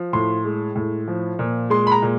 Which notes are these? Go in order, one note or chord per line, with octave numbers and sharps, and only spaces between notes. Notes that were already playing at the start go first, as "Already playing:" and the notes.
Already playing: F3
A2 C6
G#3
A2
F3
A#2
G#3 C6
B5
A#5
A#2